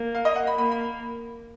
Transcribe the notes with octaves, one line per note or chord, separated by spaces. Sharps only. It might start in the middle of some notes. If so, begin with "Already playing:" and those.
Already playing: A#3
F5
D#5
F#5
B5
A#3 B5
B5